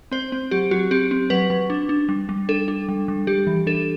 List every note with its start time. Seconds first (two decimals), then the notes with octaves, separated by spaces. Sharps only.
0.12 C4 C5
0.32 C4
0.51 F#3 G4
0.71 F#3 F#4
0.91 C4 G4
1.11 C4
1.30 F#3 B4
1.50 F#3
1.70 D4
1.89 D4
2.09 G3
2.29 G3
2.49 D4 A4
2.68 D4
2.89 G3
3.08 G3
3.27 G3 G4
3.47 E3
3.67 D4 A4